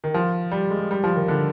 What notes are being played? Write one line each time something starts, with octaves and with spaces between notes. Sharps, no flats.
D#3
F3
G3
G#3
G3
F3
D#3
D3